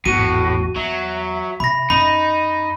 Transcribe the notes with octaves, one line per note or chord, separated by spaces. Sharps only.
G#1 E2 A2 F#4 D#7
E2 F#3 E5
C3 B5 A#6
F#2 C#4 D#4 B5